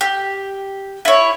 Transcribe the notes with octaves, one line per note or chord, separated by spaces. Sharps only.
G4
E4 C#5